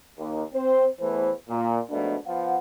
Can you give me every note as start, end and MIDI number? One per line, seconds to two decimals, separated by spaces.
0.19 0.43 39
0.53 0.87 60
0.53 0.87 72
1.00 1.31 40
1.00 1.31 52
1.00 1.31 57
1.00 1.31 71
1.00 1.31 72
1.49 1.80 46
1.90 2.16 44
1.90 2.16 47
1.90 2.16 53
1.90 2.16 57
1.90 2.16 62
2.27 2.57 53
2.27 2.57 59
2.27 2.57 77
2.27 2.57 78